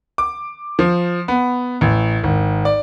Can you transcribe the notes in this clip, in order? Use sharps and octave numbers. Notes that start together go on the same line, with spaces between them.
D6
F3
B3
A1
G#1
D5